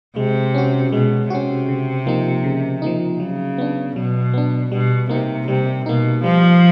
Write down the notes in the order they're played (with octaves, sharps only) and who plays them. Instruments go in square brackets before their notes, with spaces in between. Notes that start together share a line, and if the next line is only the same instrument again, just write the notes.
[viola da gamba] C3 [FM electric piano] G#3
[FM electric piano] C#4 F#4
[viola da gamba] B2 [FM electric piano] G#3
[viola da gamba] C3 [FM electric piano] C#4 F#4
[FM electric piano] C#3
F3 A#3 D#4
C#3
F3 A#3 D#4
[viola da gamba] C#3 [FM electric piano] F#3
[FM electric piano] B3 D4
[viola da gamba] B2 [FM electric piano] F#3
[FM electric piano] B3 D4
[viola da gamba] B2 [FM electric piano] G3
[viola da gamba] C3 [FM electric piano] A#3 D#4
[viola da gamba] C3 [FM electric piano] G3
[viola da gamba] B2 [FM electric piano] A#3 D#4
[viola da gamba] F3 [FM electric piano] G3